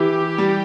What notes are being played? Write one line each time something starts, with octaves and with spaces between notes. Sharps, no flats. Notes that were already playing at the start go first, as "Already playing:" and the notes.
Already playing: E3 G4
G3